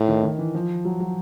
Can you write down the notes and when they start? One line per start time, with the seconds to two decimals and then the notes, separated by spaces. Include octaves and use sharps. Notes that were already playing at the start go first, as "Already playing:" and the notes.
Already playing: A2
0.08 D#3
0.24 D#3
0.38 E3
0.55 F3
0.85 F#3
1.00 F#3